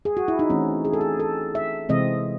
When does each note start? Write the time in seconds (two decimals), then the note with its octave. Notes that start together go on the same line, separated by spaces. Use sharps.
0.05 G#4
0.17 F#4
0.28 E4
0.39 D#4
0.50 E3 A3 C4 C#4
0.85 G#4
0.93 A4
1.01 G#4
1.20 A4
1.55 E5
1.89 C3 E3 G#3 C4 D#5